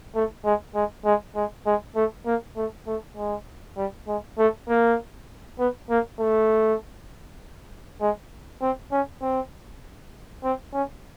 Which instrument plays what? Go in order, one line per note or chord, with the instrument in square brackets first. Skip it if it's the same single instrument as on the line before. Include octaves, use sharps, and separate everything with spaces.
[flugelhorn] A3
G#3
G#3
G#3
G#3
G#3
A3
A#3
A3
A3
G#3
G3
G#3
A3
A#3
B3
A#3
A3
G#3
C4
C#4
C4
C4
C#4